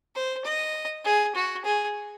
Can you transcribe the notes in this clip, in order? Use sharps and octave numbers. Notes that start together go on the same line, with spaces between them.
C5
D#5
G#4
F#4
G#4